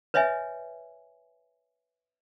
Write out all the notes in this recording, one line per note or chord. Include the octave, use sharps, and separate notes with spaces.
B4 C#5 D#5 E5 G#5